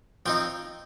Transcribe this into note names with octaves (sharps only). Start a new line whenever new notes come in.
F3 C4 D#4 G5